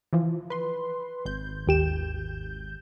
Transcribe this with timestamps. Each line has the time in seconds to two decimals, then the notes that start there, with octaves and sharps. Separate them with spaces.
0.13 E3 F3
0.50 B4 C6
1.25 G#1 G6
1.67 D#2 G4 E7